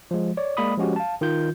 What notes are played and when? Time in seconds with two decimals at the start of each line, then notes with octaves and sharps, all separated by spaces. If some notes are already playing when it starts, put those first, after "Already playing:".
0.11 F3 G#3
0.37 C#5 D5
0.57 G#3 A#3 D5 B5 D#6
0.77 F3 G#3 C#4 F#4 G4
0.96 F5 A5
1.21 D#3 F4 G6